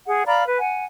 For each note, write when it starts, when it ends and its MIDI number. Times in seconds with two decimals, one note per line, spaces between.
0.06 0.26 68
0.06 0.26 78
0.26 0.43 74
0.26 0.43 77
0.26 0.43 82
0.26 0.43 83
0.45 0.56 71
0.60 0.85 78
0.60 0.85 80